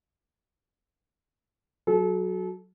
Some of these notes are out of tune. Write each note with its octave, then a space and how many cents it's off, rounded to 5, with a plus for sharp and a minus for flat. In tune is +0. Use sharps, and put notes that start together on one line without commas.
F#3 +0 A4 -35